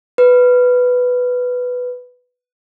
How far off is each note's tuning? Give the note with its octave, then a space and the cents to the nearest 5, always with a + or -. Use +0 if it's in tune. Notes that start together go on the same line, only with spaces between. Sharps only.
B4 +5